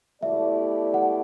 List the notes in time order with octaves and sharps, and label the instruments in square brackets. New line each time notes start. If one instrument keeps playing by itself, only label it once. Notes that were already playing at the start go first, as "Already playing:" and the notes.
[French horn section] B2 A3 E4 G4 D5 [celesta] E5
[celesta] F#5